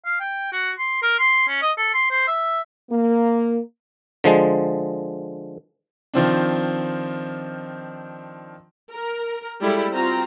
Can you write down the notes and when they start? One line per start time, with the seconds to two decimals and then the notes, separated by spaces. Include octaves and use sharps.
0.05 F5
0.20 G5
0.52 F#4
0.79 C6
1.02 A#4
1.19 C6
1.48 C#4
1.62 D#5
1.77 A4
1.94 C6
2.10 C5
2.27 E5
2.91 A#3
4.24 D3 F3 G#3
6.14 D#3 F3 C4 D4
8.91 A#4
9.60 G3 G#3 E4 A4
9.90 C4 F4 F#4 A#5